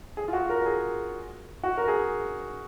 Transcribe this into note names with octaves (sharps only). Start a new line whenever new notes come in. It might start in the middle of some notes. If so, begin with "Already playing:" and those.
G#4
F4
F#4
A#4
A#4
G#4
F#4
A#4
G#4